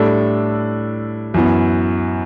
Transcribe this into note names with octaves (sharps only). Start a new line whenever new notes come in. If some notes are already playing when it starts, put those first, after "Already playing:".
Already playing: A2 G3 D4 A4
F#2 E3 B3